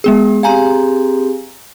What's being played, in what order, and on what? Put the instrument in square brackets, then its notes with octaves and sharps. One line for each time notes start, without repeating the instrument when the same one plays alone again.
[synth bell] G#3 B3 G#4
[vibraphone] C4 G4 G#4 [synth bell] F5 G#5 A#5